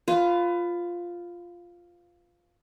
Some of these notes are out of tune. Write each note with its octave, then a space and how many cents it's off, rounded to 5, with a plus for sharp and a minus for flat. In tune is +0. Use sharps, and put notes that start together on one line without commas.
F4 +0 B4 +25